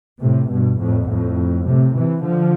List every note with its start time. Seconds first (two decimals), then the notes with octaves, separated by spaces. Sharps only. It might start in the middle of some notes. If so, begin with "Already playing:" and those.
0.21 A2 C3
0.50 G2 B2
0.79 F2 A2
1.08 F2 A2
1.66 A2 C3
1.95 C3 E3
2.24 D3 F3